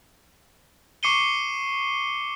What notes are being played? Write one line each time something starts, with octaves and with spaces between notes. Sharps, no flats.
C#6 D6 C7 C#7 D#7 G7